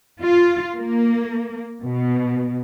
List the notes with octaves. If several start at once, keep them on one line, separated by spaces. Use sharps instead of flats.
F4
A#3
B2